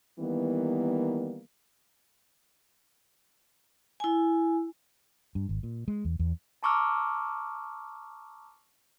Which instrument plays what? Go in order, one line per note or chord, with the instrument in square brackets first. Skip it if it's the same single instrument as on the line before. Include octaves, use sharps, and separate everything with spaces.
[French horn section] D#3 E3 G3 A#3 B3
[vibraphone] E4 G#5
[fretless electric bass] G2
G#1
A#2
G#3
E2
E2
[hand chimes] A5 A#5 C#6 D6 E6 F6